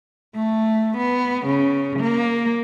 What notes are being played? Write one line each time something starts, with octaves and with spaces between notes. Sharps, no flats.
A3
B3
C#3
A#3